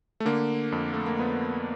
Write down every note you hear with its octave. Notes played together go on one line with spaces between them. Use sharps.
A3
D3 A#3
F2
A3
A#3
F2 B3